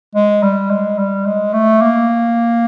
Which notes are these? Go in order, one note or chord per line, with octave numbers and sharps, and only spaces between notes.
G#3
G3
G#3
G3
G#3
A3
A#3